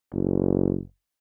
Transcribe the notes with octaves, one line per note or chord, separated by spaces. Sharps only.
F#1